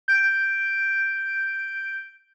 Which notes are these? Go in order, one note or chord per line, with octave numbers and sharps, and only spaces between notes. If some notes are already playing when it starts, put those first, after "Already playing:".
G6 D7